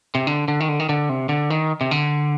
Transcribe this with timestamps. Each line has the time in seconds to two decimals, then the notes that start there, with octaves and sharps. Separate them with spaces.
0.15 C3
0.27 D3
0.48 D3
0.60 D#3
0.69 D3
0.80 D#3
0.89 D3
1.09 C3
1.29 D3
1.50 D#3
1.81 C3
1.91 D3